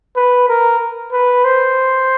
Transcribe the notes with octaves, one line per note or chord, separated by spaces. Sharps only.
B4
A#4
B4
C5